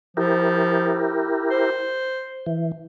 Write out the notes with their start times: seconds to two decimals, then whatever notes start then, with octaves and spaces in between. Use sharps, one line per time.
0.17 F3 E4 G4 A#4
1.50 C5
2.46 E3